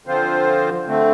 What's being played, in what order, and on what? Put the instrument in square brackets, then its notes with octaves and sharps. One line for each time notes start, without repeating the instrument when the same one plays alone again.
[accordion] D3 F3 C4 F4 C5
D3 A3 C4